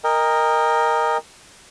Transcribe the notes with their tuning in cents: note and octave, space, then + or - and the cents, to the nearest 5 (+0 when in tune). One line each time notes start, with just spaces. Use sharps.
A#4 +0 D#5 +0 G5 +40